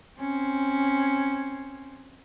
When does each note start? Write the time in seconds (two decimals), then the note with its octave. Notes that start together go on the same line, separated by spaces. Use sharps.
0.19 C4 C#4